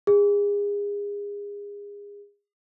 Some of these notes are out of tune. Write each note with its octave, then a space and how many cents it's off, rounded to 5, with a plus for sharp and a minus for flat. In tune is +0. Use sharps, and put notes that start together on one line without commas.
G#4 -30